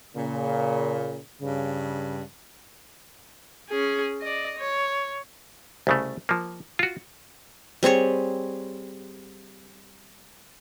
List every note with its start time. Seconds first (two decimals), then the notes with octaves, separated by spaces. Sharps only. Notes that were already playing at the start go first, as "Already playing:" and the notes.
0.15 A#2 C#3
1.41 G2 C#3
3.70 C#4 G#4
4.21 D5 D#5
4.59 C#5
5.87 C2 C#3 A3
6.29 F3 A#3
6.79 F4 F#4
7.83 G3 C4 G#4 C#5